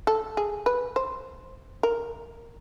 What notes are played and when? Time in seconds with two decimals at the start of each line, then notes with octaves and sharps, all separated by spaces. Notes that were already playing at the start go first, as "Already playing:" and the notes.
0.07 A4
0.37 G#4
0.66 B4
0.96 C5
1.83 A#4